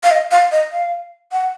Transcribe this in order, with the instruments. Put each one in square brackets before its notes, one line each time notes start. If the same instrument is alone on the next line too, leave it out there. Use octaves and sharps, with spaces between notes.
[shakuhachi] F5
D#5
F5
D#5
F5
F#5